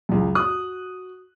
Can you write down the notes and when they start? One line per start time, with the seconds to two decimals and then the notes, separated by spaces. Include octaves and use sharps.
0.09 C#2 F#2
0.35 F#4 D#6 F#6